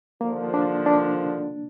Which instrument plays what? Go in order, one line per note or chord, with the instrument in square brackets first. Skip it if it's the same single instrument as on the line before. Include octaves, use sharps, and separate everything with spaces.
[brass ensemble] D#2 D3 F3 [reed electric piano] A#3
[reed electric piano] D4
D4